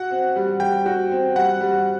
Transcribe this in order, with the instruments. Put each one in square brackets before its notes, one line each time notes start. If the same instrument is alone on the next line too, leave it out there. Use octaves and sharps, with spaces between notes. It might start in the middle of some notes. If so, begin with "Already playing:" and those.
Already playing: [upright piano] F#4 [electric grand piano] F#5
[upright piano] C4
G3
[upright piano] G3 [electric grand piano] G5
[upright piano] F#4
C4
[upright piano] G3 [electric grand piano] F#5
[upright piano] G3